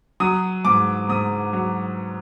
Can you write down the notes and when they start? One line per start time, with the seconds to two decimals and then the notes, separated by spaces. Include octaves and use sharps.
0.20 F#3 D#6
0.65 G#2 D6
1.09 G#2 D#6
1.53 F#3